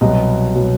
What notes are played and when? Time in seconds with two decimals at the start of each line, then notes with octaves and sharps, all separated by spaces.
0.01 C2 B2 F#3 D#5
0.54 B2 F#3